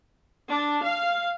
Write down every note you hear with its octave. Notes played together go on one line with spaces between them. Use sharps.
D4
F5